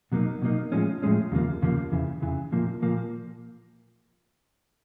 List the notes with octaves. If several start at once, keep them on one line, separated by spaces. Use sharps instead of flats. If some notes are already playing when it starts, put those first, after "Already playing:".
B2 F#3 A#3 D#4
B2 F#3 A#3 D#4
A2 F3 G#3 C#4
A2 F3 G#3 C#4
D#2 C#3 F3 A#3
D#2 C#3 F3 A#3
E2 C#3 E3
E2 C#3 E3
A#2 F3 A#3
A#2 F3 A#3